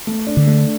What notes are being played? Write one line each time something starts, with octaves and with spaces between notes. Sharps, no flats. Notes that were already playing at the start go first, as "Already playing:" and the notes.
A3
D4
D3
A3